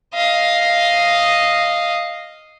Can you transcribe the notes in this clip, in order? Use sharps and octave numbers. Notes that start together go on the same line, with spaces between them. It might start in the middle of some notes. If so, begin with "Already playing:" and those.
D#5 F5